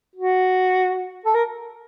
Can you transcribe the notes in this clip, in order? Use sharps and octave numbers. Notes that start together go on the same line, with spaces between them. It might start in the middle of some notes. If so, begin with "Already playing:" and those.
F#4
A4
A#4